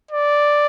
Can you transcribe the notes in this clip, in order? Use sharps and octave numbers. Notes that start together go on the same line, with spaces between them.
D5